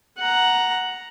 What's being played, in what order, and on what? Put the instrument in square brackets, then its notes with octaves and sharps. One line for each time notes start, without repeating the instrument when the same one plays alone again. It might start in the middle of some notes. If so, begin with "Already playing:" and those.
[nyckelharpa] F#5 A#5